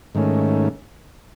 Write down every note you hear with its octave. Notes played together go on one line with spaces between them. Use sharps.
G#2 D#3 A3 C#4